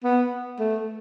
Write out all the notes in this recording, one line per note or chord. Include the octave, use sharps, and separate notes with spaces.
B3
A3